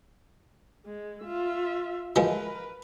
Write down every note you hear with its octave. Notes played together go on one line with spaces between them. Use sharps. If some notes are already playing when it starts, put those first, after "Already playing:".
G#3
F4 E5
E3 F3 G#3 A#4 B4